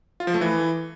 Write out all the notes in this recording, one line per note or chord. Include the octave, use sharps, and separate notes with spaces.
F4
F3
A3
E3